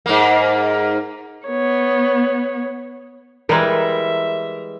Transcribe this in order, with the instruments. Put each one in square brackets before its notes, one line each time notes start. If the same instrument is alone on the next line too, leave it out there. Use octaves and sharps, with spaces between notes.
[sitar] G#2 A#3
[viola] B3 C#5
[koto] E3 G3 G#3 [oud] A#4 [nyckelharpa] E5